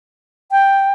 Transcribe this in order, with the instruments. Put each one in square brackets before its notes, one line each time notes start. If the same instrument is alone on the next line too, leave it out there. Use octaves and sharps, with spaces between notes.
[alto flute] G5